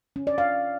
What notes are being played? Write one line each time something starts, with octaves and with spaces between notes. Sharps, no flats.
C#4
D5
F5